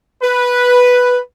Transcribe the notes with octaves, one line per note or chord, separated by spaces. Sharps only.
B4